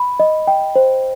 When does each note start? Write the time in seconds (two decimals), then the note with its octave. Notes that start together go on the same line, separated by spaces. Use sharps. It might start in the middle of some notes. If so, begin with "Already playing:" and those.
Already playing: B5
0.20 D#5
0.47 G5
0.76 C5